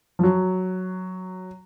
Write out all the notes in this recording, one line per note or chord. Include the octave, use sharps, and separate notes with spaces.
F3
F#3